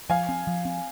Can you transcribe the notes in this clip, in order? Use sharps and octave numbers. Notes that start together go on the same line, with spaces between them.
F3 F5 G#5
C4
F3
C4